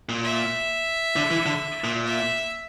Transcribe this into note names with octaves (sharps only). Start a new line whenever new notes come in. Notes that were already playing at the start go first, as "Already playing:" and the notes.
A#2
E5
D3
E3
D3
A#2
E5